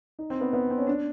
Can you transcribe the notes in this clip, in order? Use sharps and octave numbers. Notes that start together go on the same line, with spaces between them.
D#4
C4
B3
B3
C4
C#4
D4